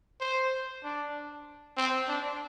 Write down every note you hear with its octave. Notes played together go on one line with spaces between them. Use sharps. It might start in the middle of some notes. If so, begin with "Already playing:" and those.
C5
D4
C4
D4